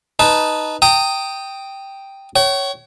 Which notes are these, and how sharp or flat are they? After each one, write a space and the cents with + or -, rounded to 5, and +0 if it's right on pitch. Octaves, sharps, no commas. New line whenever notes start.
D#4 +0 B4 +0 A5 -10
G5 +0 A#5 -40 D#6 +0
C#5 +0 G5 -45